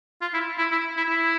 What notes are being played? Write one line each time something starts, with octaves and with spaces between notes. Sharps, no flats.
F4
E4
E4
E4
E4
E4